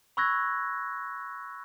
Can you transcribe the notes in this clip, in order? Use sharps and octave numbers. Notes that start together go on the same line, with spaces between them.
B5 C#6 E6 F#6 G#6 A#6